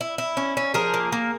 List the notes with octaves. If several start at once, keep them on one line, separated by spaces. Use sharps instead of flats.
E4
E4
C#4
C#4
F3 G#4 A#4
A#3
A#3